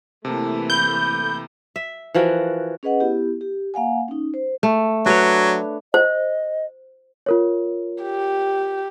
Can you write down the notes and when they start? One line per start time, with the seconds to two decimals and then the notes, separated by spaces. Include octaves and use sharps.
0.25 C3 E3 A3 A#3 A5
0.70 B5 G6
1.76 E5
2.14 E3 F3 F#4 A#4
2.83 C#4 G#4 B4 D#5 F#5
3.00 B3 E4 G4
3.41 G4
3.74 A#3 F5 F#5 G#5
4.08 C#4 D#4
4.34 C5
4.63 A3
5.06 F#3 D4 B4 C#5
5.94 C5 D#5
7.26 F4 A#4 C#5
8.03 G4